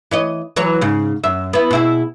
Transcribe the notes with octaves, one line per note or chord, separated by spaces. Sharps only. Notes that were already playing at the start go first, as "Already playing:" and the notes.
E3 C#5 D#5
E3 F#3 C#5
G#2 C#3
F#2 E5
B3 E4
B2 E4 G#4